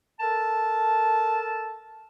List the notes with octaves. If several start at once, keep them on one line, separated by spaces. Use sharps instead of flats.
A4 A#4 A5